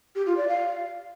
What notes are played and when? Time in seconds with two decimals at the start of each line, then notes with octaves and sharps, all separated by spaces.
0.15 G4
0.26 F4
0.37 D5
0.48 F5